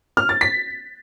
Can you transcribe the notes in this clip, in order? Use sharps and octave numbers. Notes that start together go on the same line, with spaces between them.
F6
A6
B6